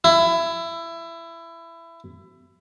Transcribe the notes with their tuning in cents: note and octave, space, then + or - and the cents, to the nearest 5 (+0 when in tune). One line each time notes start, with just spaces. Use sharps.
E4 +20